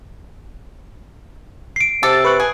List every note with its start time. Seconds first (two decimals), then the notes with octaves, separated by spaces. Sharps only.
1.76 C7 D7
2.03 C3 A4 D6 A6
2.24 B4 C#6 F#6
2.40 G#4